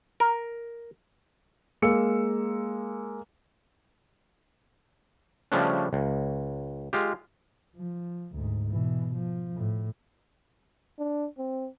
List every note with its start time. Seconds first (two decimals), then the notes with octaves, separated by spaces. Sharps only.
0.20 A#4
1.82 G#3 A#3 E6 C#7
5.52 C#3 F3 G3 A3 C#4 D4
5.93 C#2
6.93 G#3 F4 G4
7.76 F3
8.32 D2 G#2
8.69 B2 E3
9.15 F3
9.55 A2
10.99 D4
11.38 C4